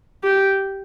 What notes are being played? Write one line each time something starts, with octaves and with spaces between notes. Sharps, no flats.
G4